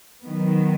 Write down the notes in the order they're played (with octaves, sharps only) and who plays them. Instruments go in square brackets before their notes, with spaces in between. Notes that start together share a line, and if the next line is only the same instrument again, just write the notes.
[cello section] D#3 F#3 B3